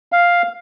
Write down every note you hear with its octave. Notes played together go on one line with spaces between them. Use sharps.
F5